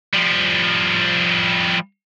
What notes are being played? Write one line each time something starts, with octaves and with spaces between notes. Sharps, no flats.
F3 G3